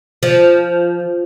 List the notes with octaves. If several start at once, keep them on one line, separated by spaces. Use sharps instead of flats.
F3